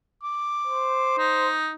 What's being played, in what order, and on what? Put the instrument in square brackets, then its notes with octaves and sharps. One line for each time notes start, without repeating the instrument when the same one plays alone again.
[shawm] D6
[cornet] C5
[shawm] D#4